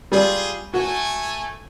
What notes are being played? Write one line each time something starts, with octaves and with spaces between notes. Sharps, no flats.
G3 F4 G#4
A3 F#4 G#5